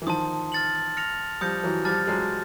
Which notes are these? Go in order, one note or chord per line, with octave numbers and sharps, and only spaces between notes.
E3
D#3 F3 A5 C6 D#6
F6 A6 C#7 F#7
F6 A#6 C#7 F7
F3 G3 D#6 G6 A#6 C#7
E3 F#3
F3 G3 A5 D6 F6 A6
F#3 G#3